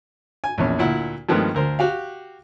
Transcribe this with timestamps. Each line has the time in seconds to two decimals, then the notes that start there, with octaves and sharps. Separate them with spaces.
0.44 G#5
0.58 A#1 E2 C#4
0.79 D2 A#2 E4 F#5
1.29 G2 D#3 F3 G#3 A3 B3
1.54 D2 A#4 C5
1.79 F#4 G4 F5